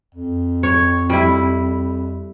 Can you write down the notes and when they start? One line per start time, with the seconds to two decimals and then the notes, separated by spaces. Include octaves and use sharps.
0.15 F2
0.63 C#5
1.10 G3 E4